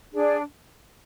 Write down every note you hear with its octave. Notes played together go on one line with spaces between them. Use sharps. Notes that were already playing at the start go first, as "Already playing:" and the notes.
D4 G#4 D5